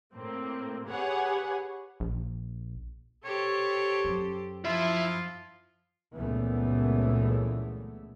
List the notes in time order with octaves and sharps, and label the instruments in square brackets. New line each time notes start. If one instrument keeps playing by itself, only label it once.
[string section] A2 A#3 C4
G4 G#4 B4 C#5 F#5 G#5
[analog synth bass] A#1
[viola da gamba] G4 A4 C5 [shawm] C#5
[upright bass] F#2
[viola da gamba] F3 [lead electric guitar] E4 E5 [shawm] F4
[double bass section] C#2 F#2 A#2 E3 A3 B3